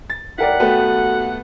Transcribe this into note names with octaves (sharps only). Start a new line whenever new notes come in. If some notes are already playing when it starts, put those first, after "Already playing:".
A6
D#2 E4 A#4 C#5 D5 F#5 G5 B6
A3 B3 F#4 A4 B4